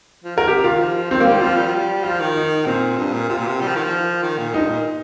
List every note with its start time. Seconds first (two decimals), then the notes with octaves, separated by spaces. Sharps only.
0.24 F3
0.36 D#3 A#4
0.48 C3 G4
0.63 D#3 F4
0.79 F3
1.10 D#3 C4
1.20 A#3
1.26 G3
1.31 C4
1.41 F3 F4
1.57 G3
1.66 F3
1.74 G3
2.04 F3 F4
2.20 D#3
2.36 D#4
2.66 A#2 C4
2.98 G2
3.13 A#2
3.29 C3 F4
3.38 A#2
3.47 C3
3.61 G3
3.68 F3
3.76 D#3
3.83 F3
4.23 D#3
4.38 A#2
4.54 G2 D#4
4.69 A#2